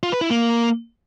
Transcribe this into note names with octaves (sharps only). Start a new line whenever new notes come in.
F4
B4
E4
A#3